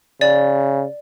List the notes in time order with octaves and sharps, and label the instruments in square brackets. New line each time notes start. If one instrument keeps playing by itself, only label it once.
[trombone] C#3 [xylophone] D5